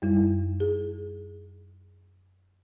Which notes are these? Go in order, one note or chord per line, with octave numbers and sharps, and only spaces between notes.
F#2 G3 E4
G#4